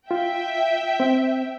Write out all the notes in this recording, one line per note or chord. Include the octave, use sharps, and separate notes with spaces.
F4 E5 G5
C4